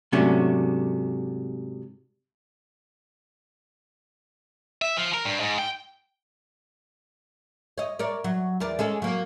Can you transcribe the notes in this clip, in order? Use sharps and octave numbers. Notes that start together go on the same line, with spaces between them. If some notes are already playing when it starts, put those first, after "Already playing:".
G#2 C3 F#3 A3 C#4 D4
E5
F3
A#4
G2
G#2
G5
C#5 D#5
A#4 C#5 D5
F#3
E2 A#4 D5
G#3 C#4 A4
F#3 A#3